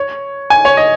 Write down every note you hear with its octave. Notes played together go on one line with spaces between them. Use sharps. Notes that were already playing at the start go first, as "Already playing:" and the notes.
Already playing: C#5
G#5
C#5
D#5